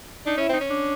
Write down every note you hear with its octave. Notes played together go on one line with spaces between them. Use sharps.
D4 D#4
C#4 E4
C4 D#4
C#4
D4